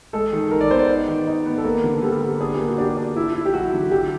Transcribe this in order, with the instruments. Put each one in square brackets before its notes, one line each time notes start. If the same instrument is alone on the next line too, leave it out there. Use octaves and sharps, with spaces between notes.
[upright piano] G#3 [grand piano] A4
[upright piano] D#3
[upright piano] D#3 [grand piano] A#4
[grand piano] D5
[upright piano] B3 [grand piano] C5
[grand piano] D5
[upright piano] D#4
D#3
D#4
B3
[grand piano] A4
[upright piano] A#3 [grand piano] A#4
[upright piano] D3
[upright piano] G3 [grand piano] A4
[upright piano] G3
[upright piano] D4 [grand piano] G#4
[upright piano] A#3 [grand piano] G4
[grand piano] F#4
[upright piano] D4 [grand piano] G4
[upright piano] D4
E4
E4
[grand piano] G4
[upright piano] F#3 [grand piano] F#4
[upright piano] D3
[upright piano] F#3 [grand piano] G4